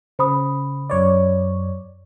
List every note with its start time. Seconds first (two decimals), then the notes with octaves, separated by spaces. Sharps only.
0.19 C#3 C5 B5 D#6
0.90 F#2 C#5 D5